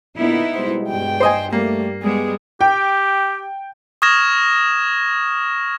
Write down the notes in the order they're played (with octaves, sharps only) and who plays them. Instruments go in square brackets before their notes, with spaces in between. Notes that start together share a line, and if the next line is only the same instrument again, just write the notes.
[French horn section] A#2 D3 [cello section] B3 D#4 E4
[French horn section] B2 G3 G#3 [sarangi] C5
[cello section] G2 [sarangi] G5
[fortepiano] C5 D#5 G#5
[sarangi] G3 [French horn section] A3 [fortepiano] A#3
[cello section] G3 G#3 [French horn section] B3 [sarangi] G#4
[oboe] G4 [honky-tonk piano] G5
[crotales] C#6 D#6 F6 G#6 A#6 E7